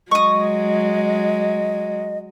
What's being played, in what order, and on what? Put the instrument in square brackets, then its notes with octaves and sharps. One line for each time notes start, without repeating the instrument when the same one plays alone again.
[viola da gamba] F#3 G#3 [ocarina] D#5 [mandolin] C#6 D#6